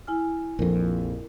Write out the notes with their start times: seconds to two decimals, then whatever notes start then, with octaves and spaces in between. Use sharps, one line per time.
0.07 E4 G#5 F6
0.59 A#1 F2 A#4